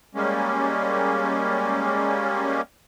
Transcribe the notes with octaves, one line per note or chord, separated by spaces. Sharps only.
G3 G#3 A#3 C#4